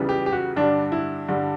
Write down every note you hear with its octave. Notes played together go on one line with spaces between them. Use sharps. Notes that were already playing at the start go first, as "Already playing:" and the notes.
Already playing: C#2 C#3 E3 G3 B3
G4
G4
F#4
G2 D3 G3 D4
E4
G2 D3 G3